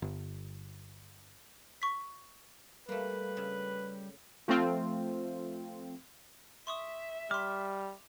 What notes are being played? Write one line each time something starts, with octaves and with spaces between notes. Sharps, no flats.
G1
C#6 B6
G3 A3 A#3 B4
C#3
F3 A3 C4 F4
E5 C6 C#6 D#6
G3 C6 D6 F6